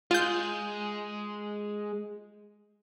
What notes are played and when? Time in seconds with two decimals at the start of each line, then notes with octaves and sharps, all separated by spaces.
0.11 G#3 F4 G6